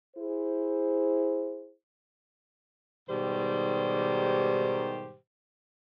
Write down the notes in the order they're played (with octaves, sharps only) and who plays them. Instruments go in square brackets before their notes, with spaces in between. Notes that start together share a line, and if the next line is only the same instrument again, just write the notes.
[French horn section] E4 G#4 C5
[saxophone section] G#2 B2 D#3 G3 G4 C5